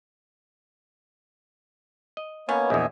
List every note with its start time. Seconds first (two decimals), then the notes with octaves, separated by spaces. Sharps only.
2.17 D#5
2.49 B2 A#3 B3 C#4 C#5
2.70 A#1 E2 D#5 E5 G#5